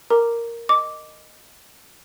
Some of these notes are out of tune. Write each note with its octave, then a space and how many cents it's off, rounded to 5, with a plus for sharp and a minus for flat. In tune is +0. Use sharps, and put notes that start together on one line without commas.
A#4 +0 A#5 +0 D6 +0
D#5 -10 D6 -5